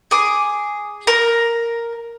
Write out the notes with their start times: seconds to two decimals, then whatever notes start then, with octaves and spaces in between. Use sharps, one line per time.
0.11 G#4 D6
1.07 A#4